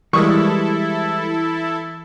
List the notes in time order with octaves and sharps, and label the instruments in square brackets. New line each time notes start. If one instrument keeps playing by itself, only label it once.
[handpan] E3 [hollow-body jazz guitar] G3 G#3 [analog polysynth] E4 A4 [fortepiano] C#6 D#6